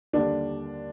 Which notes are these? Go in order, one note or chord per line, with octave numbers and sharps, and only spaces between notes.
D#2 D3 G3 D4